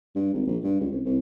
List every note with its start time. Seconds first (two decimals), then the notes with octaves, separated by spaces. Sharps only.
0.15 G2
0.33 G#1
0.47 A#1
0.64 G2
0.80 C#2
0.92 C2
1.05 C2